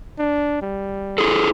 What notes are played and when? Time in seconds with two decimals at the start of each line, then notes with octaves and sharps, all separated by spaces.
0.19 D4
0.62 G3
1.18 E4 G#4 A4